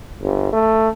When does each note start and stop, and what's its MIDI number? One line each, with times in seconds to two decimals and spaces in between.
0.22 0.48 31
0.53 0.89 57